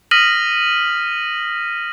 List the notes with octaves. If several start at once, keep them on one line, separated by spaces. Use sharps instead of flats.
D#6 F6 A#6 B6 D#7 F#7